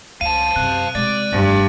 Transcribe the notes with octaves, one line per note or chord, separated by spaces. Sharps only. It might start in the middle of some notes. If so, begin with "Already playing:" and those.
C#2 F5 A5 D#7
F#2 C3 F#6
C3 G#3 D5 A6 D#7
F1 G2 D#3